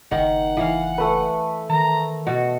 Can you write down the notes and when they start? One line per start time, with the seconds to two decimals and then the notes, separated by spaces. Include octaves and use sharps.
0.11 F#1 D#3 F#5
0.57 E3 F5
0.98 A3 B4
1.69 D#3 A#5
2.27 B2 F#4